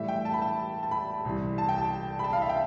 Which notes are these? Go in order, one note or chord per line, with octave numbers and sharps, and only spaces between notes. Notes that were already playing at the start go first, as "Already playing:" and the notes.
Already playing: A2 E3 G3 E5
G5
A5
B5
A5
A5
B5
C2 C3 E3
A5
G5
A5
B5
A5
F5
E5
G5